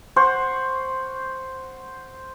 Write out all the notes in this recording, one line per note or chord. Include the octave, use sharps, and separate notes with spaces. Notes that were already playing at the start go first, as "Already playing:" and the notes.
C5 F#5 C#6